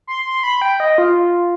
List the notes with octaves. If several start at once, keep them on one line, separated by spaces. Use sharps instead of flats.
C6
C6
B5
G5
D#5
F4